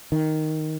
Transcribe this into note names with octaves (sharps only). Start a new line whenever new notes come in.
D#3